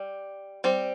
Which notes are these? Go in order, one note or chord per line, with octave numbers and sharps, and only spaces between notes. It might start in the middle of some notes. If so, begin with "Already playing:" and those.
Already playing: G3
G3 C4